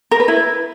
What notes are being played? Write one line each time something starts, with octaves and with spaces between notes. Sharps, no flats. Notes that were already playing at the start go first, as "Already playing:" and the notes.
A#4
B4
E4